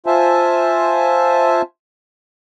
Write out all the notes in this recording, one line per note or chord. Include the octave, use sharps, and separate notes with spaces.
F4 C5 E5 G#5 A5